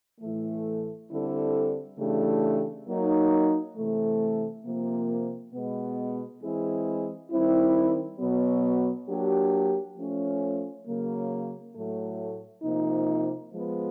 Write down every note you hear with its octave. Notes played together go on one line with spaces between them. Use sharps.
A2 E3 A3
D3 G3 C4 E4 A4
C#3 E3 A3 D4 G4
F#3 A#3 D#4
C3 E3 A3
C3 F3 A#3
B2 G#3 B3
E3 G#3 C4 E4 G#4
D#3 G3 C4 E4
B2 F#3 B3
F#3 A#3 D4 G4
F3 A3 C#4
C#3 F#3 A#3
A2 F#3 A3
C3 F3 A#3 D#4
F3 G#3 B3